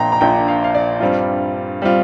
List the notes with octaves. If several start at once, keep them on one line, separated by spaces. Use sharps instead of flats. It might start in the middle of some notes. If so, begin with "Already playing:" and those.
Already playing: A#1 A#2 F3 D4 G5 A#5 C6
A#5
A#1 A#2 F3 D4 G5
F5
F5
D5
G2 G3 C4 F4
G3 C4 F4